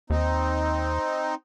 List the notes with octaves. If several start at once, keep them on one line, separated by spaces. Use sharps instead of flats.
D#2 C4 D#4